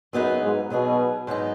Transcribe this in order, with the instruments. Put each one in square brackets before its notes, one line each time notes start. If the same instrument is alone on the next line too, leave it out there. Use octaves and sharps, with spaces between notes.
[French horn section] F#2 [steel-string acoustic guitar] F#3 B3 D#4 G#4 B4
[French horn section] G#2
[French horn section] B2 [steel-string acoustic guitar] F#3 B3 D#4 G#4 B4
[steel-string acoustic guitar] G#2 F#3 B3 D#4